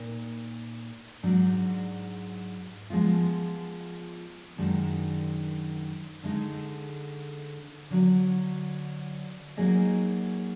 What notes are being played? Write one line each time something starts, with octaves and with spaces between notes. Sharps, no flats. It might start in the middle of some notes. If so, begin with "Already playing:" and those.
Already playing: A#2 D#4 A#4
G#2 F#3 D4
F3 G#3 B3 F4
F#2 D#3 G#3 D4
D3 G#3 D#4
D3 F#3 D4
F#3 A#3 D#4 G#4 D#5